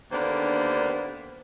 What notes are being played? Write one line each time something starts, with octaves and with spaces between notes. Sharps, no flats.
D#2 D3 A#3 B3 D4 C5